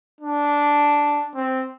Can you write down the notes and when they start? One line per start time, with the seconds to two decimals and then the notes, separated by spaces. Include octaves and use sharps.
0.21 D4
1.35 C4